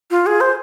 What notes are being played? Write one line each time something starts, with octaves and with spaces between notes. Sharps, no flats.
F4
G#4
C5